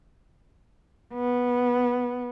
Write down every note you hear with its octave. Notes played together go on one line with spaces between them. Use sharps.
B3